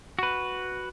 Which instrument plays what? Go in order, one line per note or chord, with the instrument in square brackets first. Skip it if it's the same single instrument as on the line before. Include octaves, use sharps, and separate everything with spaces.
[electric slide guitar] F#4 B4